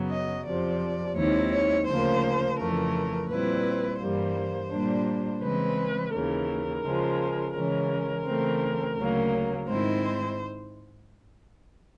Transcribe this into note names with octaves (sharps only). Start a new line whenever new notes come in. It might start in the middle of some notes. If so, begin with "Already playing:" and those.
Already playing: F#2 C#3 F#3 B3
D#5
F2 C3 F3 D5
D#2 D#3 G#3 C4 E4 C#5
C#5
D2 C#3 F3 A#3 C5
F2 C#3 E3 A3 A#4
A#2 G3 C4 E4 B4
G2 E3 G3 A#3 C5
A#2 G3 A#3 D4
C#3 E3 G#3 C4 B4
D#2 C#3 E3 A#4
C#3 F3 G#3
C#3 E3 G#3 C#4 A#4
C#3 E3 A3 C4
D2 C#3 F#3 A#3
G#2 D#3 G#3 C4 E4 C5